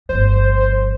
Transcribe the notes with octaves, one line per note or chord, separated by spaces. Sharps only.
G1 F3 C5